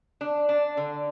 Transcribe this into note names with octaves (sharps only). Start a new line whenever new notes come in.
D4
D4
D3